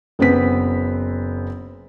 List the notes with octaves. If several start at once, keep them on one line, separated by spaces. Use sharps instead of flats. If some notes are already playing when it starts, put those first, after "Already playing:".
F#1 B3 C4 B6